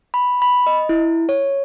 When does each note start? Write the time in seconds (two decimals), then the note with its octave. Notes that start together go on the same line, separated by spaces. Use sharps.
0.14 B5
0.42 B5
0.67 D#5
0.89 E4
1.29 C#5